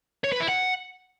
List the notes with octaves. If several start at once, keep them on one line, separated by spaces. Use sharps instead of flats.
C#5
B4
E4
F#5